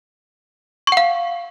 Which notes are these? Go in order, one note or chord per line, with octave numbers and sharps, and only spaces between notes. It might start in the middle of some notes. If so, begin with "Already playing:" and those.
F5 F#5 C#6